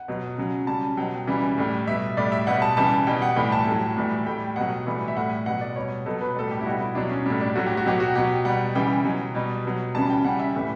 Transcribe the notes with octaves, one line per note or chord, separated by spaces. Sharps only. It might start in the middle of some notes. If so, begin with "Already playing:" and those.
Already playing: F#5
B2 F#3
C#3 F#3
C#3 G3 A5
B2 F#3 G5
C#3 E3 G3
A2 G3
B2 G3 E5
A2 G3 D5
E5
B2 G3 F#5
A5
C#3 E3 G3 A5
B2 G3 G5
F#5
A2 E3 G3 G5
A5
A2 F#3
A2 E3 G3
A2 G3 G5
B2 F#3 F#5
A2 E3 G3
E5
A2 G3 F#5
B2 F#3 F#5
D5
B2 G3 C#5
B2 F#3 A4
B4
A2 G3 A4
G4
E4
B2 G3 F#4
E4
B2 F#3 D4
C#4
A2 G3 D4
D4
A2 F#3 F#4
G4
F#4
B2 F#3 G4
F#4
B2 F#3 G4
B2 G3 F#5
C#3 E3 G3 G5
B2 F#3
B2 G3
B2 F#3
C#3 E3 G3 A5
G5
C#3 G3 F#5
E5
A2 E3 G3